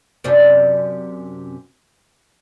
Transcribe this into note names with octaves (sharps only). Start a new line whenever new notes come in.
F#2 C3 D4